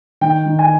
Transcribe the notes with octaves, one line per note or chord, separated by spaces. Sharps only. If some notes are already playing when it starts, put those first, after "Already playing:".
D#3 G5
D#3
G#5